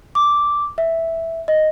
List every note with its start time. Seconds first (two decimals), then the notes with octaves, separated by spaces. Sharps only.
0.15 D6
0.78 E5
1.48 D#5